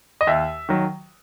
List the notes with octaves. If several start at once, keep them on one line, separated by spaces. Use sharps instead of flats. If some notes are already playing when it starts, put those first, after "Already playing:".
D#5
D#2 E5
D#3 F#3